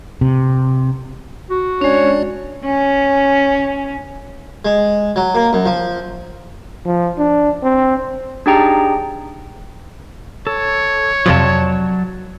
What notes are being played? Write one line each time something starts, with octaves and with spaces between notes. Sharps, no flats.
C3
F#4
G#3 C#4 D4 C#5 D5
C#4
G#3
F#3
A#3
F#2
F3
F3
D4
C4
D4 D#4 G4 G#4 G5 A#5
A4 C#5
F2 C3 F3 F#3 D5 A5